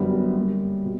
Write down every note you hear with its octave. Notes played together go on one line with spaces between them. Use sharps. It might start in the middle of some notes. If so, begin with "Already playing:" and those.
Already playing: F#2 D3 G3 B3
G2 D3 G3 A#3
B2